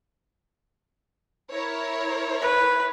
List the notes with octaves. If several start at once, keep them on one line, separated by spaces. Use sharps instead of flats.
E4 A#4 C#5
B4